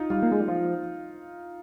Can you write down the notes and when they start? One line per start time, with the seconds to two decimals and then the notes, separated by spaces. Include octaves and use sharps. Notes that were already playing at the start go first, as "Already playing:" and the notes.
Already playing: D#4 F4
0.10 G3 F4
0.23 A#3
0.32 G#3
0.40 G3
0.48 F3